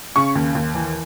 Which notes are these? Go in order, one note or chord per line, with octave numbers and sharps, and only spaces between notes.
C#3 C#6
D#2
D#2
E3